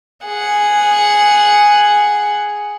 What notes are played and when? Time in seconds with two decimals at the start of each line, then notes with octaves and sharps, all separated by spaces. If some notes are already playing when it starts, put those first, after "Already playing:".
0.24 G#4 F#5